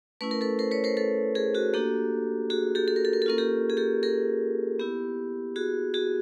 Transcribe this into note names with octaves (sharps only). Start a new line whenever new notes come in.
A3 C#4 E4 B4
A#4
A4 B4
A#4 C5
B4 C#5
A#4 C5
A4 B4
G#4 A#4
F#4 G#4
A#3 D4 F#4 G4 A4
F#4 G#4
G4 A4
A4
A#4
A4
A#4
A4
A#3 C#4 F4 A#4
G4 A4
G#4
G4 A4
G#4 A#4
B3 E4 G4
F#4 G#4
F#4 G#4